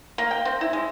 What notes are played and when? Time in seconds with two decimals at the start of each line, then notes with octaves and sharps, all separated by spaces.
0.18 A#3
0.31 G5
0.45 C4
0.61 E4
0.73 G#3